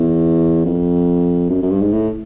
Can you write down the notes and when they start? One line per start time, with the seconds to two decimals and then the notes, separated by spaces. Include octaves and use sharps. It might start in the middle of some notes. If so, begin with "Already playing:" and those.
Already playing: E2
0.66 F2
1.50 F#2
1.62 F#2
1.71 G2
1.81 G#2
1.92 A2